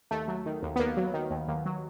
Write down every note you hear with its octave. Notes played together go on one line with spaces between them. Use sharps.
D#2 A3
F#3
D#3
D#2
B3
D#2 A#3
F#3
D#3
D#2
D#2
F#3